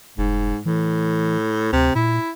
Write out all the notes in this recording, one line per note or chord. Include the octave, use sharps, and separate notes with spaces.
F1 G#2
A2 E3
D2 C3
A#2 E4